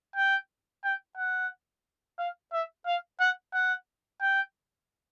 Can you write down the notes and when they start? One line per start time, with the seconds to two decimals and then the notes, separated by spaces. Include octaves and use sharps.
0.16 G5
0.84 G5
1.17 F#5
2.19 F5
2.53 E5
2.87 F5
3.20 F#5
3.53 F#5
4.21 G5